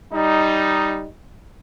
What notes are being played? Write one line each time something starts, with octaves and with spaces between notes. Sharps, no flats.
G3 D#4